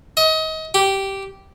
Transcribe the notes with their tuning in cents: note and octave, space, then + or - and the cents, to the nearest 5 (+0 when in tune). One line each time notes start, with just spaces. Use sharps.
D#5 +30
G4 -10